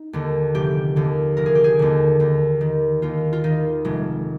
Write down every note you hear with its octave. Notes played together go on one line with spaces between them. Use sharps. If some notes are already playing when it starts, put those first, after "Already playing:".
Already playing: D#4
D#2 D3
F1 G4
D#2 D3
F1 A#4
G#4
G4
G#4
D#2 D3
D#2
D#3
D#2 F4
F4
D#3 D#4
F1 G#3